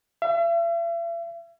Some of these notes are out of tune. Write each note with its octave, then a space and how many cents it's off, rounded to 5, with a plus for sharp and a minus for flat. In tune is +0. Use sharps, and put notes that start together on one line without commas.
E5 +45